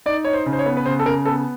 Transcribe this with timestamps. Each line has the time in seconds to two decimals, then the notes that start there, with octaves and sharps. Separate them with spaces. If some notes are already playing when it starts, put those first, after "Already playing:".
0.06 D#4 D5
0.25 D#4 C#5
0.33 C5
0.46 C#3
0.53 C5
0.59 C#5
0.66 B3
0.77 B4
0.86 C#3 C5
1.00 A4
1.06 C#3 A#4
1.26 B3 A4